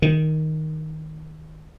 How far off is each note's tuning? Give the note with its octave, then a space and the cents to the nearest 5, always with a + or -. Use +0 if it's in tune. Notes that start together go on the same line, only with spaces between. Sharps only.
D#3 +5